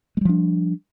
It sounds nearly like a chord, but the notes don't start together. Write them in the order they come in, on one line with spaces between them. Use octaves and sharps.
G#3 G3 F3 D4